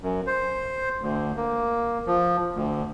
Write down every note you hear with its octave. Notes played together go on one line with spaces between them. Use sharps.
F#2
C5
D2
A#3
F3
D2